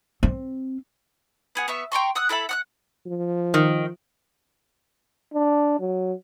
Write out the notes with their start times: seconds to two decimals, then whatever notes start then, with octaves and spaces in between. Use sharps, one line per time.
0.23 C4
1.55 B3 G#4 F#5
1.68 B3 E5 C#6
1.92 G5 A#5 C6 C#6
2.15 F#5 D#6 E6 F#6
2.29 E4 A4 E5 B5
2.49 F#5 F6 F#6
3.06 F3
3.54 D#3
5.34 D4
5.80 F#3